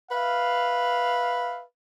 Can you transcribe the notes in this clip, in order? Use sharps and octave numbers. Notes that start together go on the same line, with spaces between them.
B4 E5 F5